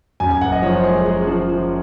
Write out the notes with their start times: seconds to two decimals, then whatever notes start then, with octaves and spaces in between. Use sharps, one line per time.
0.20 F#2 G#5
0.31 G#5
0.41 F#1 F#5
0.52 D#5
0.62 F3 C#5
0.73 C5
0.84 G#3 G#4
0.94 G#4
1.06 G#3
1.27 F3
1.49 F3